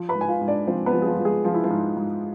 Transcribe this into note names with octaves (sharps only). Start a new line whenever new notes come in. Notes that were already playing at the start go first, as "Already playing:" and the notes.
Already playing: F3
B4 B5
G#2
G#5
F4 F5
G#2
D4 D5
F3 C4 C5
B3 B4
F3
G#4
F3 F4
F3
G#3 G#4
F3 F4
E4
F3 F4
G#2
G#2